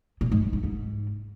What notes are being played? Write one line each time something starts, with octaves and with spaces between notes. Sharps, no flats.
A#2
G#2
G2
G#2
G#2